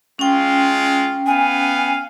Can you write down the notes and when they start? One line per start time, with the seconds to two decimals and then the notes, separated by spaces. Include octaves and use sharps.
0.19 G#3 C#4 F4 G5
1.27 B3 F5 G#5